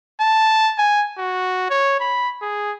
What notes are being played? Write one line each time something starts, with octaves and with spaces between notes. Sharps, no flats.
A5
G#5
F#4
C#5
B5
G#4